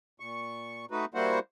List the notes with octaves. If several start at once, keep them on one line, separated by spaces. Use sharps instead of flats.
A#2 C#6
A3 D#4 F#4 B4
G3 A#3 E4 F#4 C5 F#5